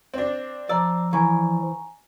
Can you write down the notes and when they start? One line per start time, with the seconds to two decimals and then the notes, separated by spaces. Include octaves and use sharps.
0.14 C4 D4
0.69 F3 D5 A5 A#5 E6
1.13 E3 G#5 A#5 C#6